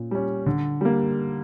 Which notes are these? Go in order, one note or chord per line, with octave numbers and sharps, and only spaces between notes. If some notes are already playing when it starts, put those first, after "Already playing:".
Already playing: A#2 C#4
G3 C#4
D3
G3 A#3